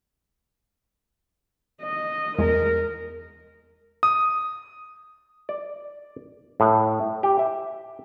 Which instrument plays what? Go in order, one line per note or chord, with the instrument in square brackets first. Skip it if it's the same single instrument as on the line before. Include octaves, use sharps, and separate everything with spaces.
[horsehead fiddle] D#5
[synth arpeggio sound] E2 G#3 [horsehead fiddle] A#4
[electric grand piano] D#6
[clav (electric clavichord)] D5
A2
G4
E5